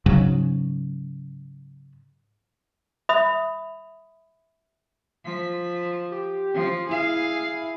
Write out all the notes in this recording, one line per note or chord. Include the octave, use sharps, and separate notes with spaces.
G#2 C#3 F#3
E5 B5 D#6
F3 B6
G4
F3
E4 G#4 F5